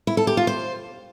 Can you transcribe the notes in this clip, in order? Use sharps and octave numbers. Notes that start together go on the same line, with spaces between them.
E4
A4
G4
F4
C5